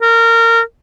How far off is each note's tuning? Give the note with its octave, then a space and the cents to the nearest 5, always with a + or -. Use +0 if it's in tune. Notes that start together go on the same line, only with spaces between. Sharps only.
A#4 -20